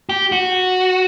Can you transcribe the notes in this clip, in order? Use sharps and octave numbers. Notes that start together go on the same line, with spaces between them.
G4
F#4